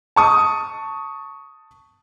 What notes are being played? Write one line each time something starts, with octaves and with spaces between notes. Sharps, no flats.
A5 C#6 D#6